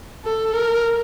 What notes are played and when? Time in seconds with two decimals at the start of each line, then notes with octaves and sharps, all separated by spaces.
0.25 A4
0.54 A#4